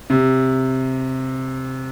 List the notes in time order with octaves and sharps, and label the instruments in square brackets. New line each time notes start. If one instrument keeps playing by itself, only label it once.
[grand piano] C3